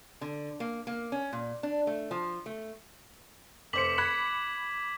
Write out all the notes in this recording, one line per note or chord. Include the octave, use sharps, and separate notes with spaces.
D3
A#3
A#3
C#4
A#2
D4
A3
F3
A3
F1 C5 D6 B6 C#7 F#7
B5 F#6 G#6 B6